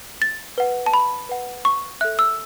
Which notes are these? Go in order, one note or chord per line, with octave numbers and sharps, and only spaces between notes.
A6
B4 F#5
A5
B5
B4 F#5
C#6
A4 E5 F#6
E6